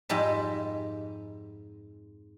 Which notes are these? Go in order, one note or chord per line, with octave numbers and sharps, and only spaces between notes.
F2 G#2 G3 G4 D#5 E5